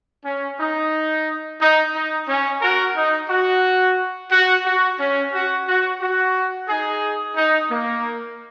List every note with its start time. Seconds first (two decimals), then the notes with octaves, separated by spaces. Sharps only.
0.24 C#4
0.59 D#4
1.60 D#4
1.94 D#4
2.28 C#4
2.61 F#4 A#4
2.96 D#4
3.29 F#4
4.31 F#4
4.66 F#4
4.99 C#4
5.33 F#4
5.67 F#4
6.01 F#4
6.68 D#4 G#4
7.36 D#4
7.70 A#3